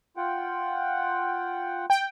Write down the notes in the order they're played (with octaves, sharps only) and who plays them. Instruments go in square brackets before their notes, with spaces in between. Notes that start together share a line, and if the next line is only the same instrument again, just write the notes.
[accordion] F4 F#5 G5
[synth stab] G5